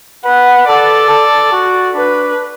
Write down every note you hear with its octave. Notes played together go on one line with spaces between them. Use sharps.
B4 F#5
A4 D5
A4
F#4
D4 B4